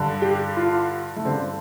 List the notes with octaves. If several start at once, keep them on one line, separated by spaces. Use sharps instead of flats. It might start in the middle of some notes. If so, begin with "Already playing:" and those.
Already playing: G2 D3
G4
F4
A3
G2 D3 C4